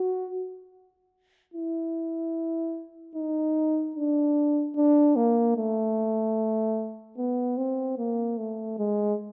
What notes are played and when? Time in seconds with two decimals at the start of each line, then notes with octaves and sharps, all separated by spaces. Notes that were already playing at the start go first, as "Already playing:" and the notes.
Already playing: F#4
1.54 E4
3.15 D#4
3.96 D4
4.76 D4
5.16 A#3
5.57 A3
7.18 B3
7.57 C4
7.98 A#3
8.38 A3
8.78 G#3